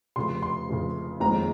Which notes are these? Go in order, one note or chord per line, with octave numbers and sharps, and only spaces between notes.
F1 F2 C#3 C6
C6
F1 F2 C#3
F#1 F2 D#3 G#3 C4 A#5